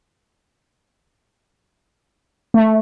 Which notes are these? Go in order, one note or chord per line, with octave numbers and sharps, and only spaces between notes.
A3